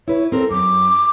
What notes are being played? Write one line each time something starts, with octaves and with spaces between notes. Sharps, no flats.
E4 B4 C#5
C4 A4 A#4
F#2 D6